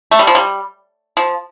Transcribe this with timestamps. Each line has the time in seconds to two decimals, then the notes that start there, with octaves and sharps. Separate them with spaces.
0.11 A3
0.19 G3
0.27 F3
0.35 G3
1.17 F3